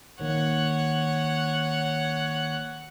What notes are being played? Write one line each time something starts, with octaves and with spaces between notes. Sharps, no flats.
A#1 D#3 A#3 C#5 F#5